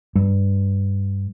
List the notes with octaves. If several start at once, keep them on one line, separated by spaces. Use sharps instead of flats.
G2